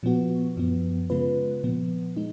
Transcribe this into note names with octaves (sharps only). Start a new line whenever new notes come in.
A#2 F3 B3 F#4
F#2 F3 B3
C#3 G#3 B3 F4 B4
A#2 F3 B3
G#3 D#4